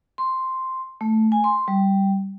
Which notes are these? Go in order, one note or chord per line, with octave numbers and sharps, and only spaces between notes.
C6
A3
G#5
C6
G3